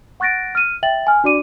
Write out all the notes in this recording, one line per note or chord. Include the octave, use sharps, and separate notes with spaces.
F#5 C#6 F#6 A6 A#6 D7
F6 D#7
E5 G5 A6 F#7
G#5 F6
D4 F#4 D5 D6 D#7